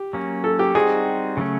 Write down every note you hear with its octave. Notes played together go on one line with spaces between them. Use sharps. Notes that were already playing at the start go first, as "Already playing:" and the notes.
Already playing: G4
F#3 A#3 C#4
A4
G4
G3 C4 D#4 F#4 G#4
C#3 F#3 A3 C#4